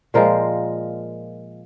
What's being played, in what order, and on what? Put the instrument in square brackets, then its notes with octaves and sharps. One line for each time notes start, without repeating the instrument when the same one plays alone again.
[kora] A#2 F3 G#3 A#4 C5